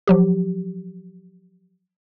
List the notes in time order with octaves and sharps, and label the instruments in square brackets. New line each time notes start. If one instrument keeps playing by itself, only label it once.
[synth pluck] F3 F#3 G4